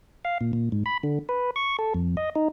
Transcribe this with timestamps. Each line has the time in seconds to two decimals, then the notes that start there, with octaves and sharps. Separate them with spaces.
0.25 F5
0.41 A#2
0.53 A#2
0.72 G#2
0.86 B5
1.03 D3
1.29 B4
1.56 C#6
1.79 A4
1.94 F2
2.17 D#5
2.35 D#4